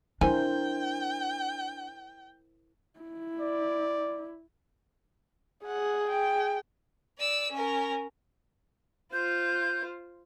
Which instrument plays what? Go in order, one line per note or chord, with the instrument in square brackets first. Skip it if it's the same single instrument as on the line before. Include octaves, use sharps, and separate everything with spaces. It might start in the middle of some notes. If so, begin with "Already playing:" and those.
[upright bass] D4 [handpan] E4 A#4 C5 [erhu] G5 [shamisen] G#5
[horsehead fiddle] E4
[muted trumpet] D5
[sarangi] G#4 [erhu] F#5
[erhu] G5
[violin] D5 E6
C#4 A#4
[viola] F4 C5 [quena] G6